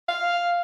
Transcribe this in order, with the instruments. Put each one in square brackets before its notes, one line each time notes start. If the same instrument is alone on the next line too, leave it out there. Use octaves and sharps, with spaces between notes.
[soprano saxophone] F5